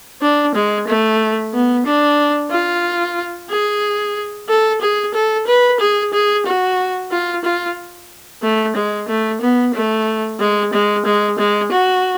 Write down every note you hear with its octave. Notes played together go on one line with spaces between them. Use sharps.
D4
G#3
A3
B3
D4
F4
G#4
A4
G#4
A4
B4
G#4
G#4
F#4
F4
F4
A3
G#3
A3
B3
A3
G#3
G#3
G#3
G#3
F#4